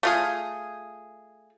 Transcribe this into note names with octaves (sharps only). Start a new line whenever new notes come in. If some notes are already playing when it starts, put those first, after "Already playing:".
A3 F4 G#4